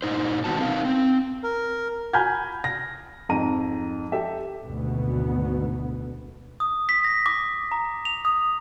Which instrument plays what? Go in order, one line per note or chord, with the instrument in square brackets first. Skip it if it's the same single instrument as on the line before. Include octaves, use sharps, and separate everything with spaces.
[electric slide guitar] A#2 D#4 C5
D#3 G3 B3 F#4 A5
C4 D#4 A#4 F5
C4
[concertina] A#4
[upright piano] G#5 A#5 B5 F6 G6 G#6
A#6
F2 G#2 A#5 D#7
G4 A4 E5
[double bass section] G#1 D2 B2 B3
[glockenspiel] D#6
B6
A#6
D6
A#5
F7
D#6